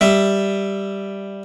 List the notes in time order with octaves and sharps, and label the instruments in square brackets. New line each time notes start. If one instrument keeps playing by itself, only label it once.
[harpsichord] G3 E5